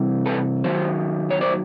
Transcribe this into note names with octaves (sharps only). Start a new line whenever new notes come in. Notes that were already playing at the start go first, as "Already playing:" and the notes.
Already playing: C2 C3 E3
A4 B4
D#2 D#3 F#3 C5
C#5
C5 D5